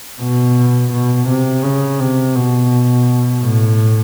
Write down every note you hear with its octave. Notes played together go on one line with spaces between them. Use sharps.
B2
B2
C3
C#3
C3
B2
A2